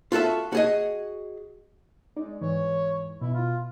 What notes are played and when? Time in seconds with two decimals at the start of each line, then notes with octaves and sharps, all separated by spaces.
0.12 F4 F#4 A4 E5
0.52 F#4 G#4 D#5
2.16 G#3 D#4 D5
2.41 G#2 E3 C#5
3.21 B2 E4
3.34 F4